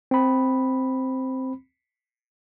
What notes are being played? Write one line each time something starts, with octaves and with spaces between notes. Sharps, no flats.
C4 B5